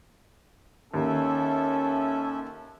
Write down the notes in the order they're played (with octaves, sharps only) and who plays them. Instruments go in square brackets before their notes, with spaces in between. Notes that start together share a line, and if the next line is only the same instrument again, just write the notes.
[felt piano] D#2 [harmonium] C#4 E5 [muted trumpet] A4